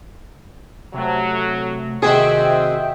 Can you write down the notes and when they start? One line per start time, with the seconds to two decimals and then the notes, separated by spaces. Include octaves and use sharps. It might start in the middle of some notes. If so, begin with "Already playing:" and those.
0.94 C3 F#3 A3
2.02 C3 D#3 C4 F#4 G#4 E5 G5